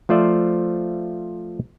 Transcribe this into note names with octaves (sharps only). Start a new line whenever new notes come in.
F3 A3 F4 C5 D5 E5